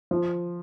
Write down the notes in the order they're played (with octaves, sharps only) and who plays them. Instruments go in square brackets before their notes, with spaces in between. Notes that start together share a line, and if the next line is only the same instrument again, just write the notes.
[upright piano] F3